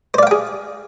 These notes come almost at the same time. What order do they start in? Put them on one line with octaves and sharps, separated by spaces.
C5 D5 F5 G5 G#4